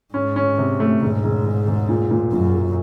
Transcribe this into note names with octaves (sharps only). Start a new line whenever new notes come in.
G#2 C#4
C#4
C3
A3
E1 G#2
E1
E1
E1
A#2
A#2
F#2 A#2
F#3